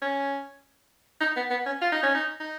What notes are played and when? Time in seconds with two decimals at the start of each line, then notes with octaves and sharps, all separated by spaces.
0.01 C#4
1.20 D#4
1.36 B3
1.50 B3
1.66 C#4
1.81 F4
1.92 D#4
2.03 C#4
2.15 D#4
2.40 D#4